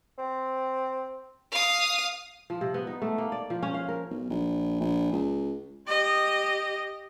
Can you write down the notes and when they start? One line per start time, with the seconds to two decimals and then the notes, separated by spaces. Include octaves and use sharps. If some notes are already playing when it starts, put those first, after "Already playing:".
0.18 C4
1.52 F5 D#6
2.50 F3
2.61 C3
2.74 B3
2.87 D#4
3.02 A3
3.18 A#3
3.32 D5
3.50 F3
3.63 C#4
3.74 F5
3.89 A#4
4.10 B1
4.30 A#1
4.80 A#1
5.12 C#2
5.88 G4 D#5